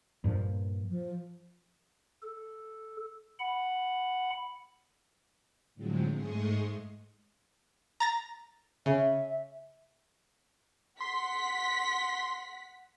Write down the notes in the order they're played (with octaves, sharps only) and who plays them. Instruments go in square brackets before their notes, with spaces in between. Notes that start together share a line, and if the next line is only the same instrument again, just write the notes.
[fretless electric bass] G2 A#2 F3
[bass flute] F3
[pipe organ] A4
F#5 B5
[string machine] A2 D3 F3 F#3 G#3 C4
G#2 G#3 A3 C6 C#6 D#6
[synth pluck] A#5 A6 A#6
[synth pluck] C#3 [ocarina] E5
[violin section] F#5 B6 [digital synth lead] C6